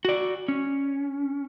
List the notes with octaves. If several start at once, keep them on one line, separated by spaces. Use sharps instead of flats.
F#4 D5
C#4